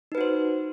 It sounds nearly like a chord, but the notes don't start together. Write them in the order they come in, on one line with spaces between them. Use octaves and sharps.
D#4 B4 F#4 C5